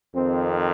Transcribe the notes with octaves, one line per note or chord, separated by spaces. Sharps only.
F2 D#3 C4